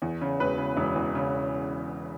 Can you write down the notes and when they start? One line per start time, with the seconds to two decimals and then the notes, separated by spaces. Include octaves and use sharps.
0.02 E2
0.21 C#3
0.40 E1 B4
0.58 C#3
0.77 E1
0.96 E2
1.15 C#3